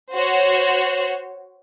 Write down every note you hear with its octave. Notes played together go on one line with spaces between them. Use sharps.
F#4 C5 C#5